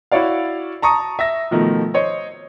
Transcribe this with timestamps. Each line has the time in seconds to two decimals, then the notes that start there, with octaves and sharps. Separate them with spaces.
0.12 E4 F#4 C#5 D5 F5
0.82 A5 A#5 C#6 D#6
1.19 E5 E6 A#6
1.51 B2 D#3 F3 A3
1.94 C5 C#5 D#5